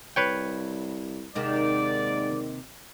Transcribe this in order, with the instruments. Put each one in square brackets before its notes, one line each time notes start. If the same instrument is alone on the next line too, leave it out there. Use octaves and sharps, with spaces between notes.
[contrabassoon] C2 [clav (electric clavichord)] B4 C#5 G5
[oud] D#2 C3 D#3 [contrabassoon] G#2 [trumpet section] D5